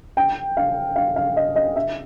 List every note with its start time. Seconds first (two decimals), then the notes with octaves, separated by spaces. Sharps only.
0.17 G5
0.57 F5
0.96 F5
1.16 F5
1.37 D#5
1.56 D#5
1.76 E5